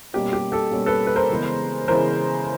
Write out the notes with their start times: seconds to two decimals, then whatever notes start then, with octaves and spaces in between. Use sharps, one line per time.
0.13 B2 G3 A#3 C#4 G4
0.33 G4
0.52 G4 A4
0.71 B2 G3 A#3 C#4
0.86 A4 B4
1.07 B4
1.16 A#4 C5
1.29 C#3 E3 G#3 B3
1.87 C#3 E3 G#3 B3 A#4 C5